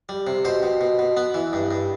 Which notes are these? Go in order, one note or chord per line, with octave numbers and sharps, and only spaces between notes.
G3
C3
B2 C5
B2
B2
B2
B3
E3
G2
G2